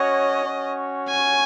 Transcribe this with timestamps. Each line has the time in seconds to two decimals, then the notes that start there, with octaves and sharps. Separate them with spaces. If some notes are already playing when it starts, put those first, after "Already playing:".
Already playing: C#4 F#4 C#5 D#5
0.43 C#4 F#4 C#5
1.09 G#5